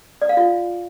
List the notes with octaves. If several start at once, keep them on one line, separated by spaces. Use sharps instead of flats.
D5
F5
F4